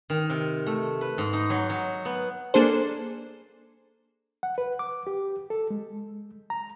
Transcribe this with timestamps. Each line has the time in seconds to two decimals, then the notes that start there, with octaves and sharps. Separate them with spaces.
0.10 D#3
0.30 C3
0.67 A3
1.01 B4
1.18 G#2
1.33 D#4
1.50 F#3
1.70 F#3
2.05 B3
2.54 A#3 D4 G#4 A4 C5
4.43 F#5
4.58 B4
4.79 D6
5.07 G4
5.50 A4
5.70 G#3
6.50 A#5